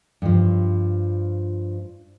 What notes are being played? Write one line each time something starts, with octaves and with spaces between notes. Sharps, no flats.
G2 F3